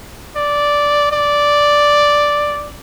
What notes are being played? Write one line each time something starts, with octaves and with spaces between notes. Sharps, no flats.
D5
D5